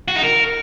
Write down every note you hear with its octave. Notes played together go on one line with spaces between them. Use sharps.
F#4
D#4
A#4